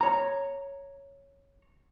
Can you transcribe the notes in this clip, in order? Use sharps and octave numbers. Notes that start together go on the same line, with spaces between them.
C#5 A#5